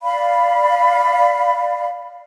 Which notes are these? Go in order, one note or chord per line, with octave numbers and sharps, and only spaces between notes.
D5 F5 B5